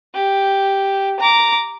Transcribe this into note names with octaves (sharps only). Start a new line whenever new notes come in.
G4
A#5 D6